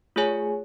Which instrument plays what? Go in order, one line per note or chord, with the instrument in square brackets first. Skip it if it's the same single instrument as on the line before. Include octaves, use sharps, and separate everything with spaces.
[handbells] A3 F4 G#4 C#5 G#5